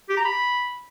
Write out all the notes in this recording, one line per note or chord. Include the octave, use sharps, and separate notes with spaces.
G4
A#5
B5